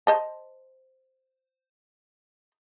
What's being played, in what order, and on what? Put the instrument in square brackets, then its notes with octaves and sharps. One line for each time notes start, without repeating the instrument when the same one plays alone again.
[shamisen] C5 D#5 A5